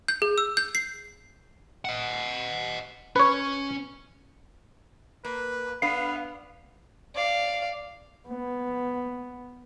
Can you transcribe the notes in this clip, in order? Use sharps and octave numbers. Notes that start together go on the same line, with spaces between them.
G6
G#4
E6
G6
C7
D#5 F#5
C#4 B4 C#5
A#3 B4
B3 D4 B4 F5
D5 F5
B3